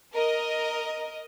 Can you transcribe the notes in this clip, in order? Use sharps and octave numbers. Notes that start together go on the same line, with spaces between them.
A#4 D#5